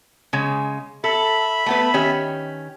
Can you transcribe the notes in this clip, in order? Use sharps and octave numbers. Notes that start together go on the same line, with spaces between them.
C#3 G#3
A4 E5 B5
A3 B3 B4
D#3 C#4 G4